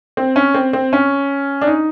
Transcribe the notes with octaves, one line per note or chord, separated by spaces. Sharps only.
C4
C#4
C4
C4
C#4
D4
D#4